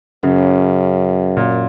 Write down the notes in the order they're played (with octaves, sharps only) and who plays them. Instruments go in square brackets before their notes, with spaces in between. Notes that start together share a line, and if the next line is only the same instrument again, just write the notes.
[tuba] F#2 [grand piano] C#3
[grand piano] A#2